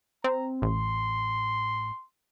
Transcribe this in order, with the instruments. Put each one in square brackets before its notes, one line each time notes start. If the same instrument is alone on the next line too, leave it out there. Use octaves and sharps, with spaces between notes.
[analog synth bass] C4 [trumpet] A#5
[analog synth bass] A1 [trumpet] C6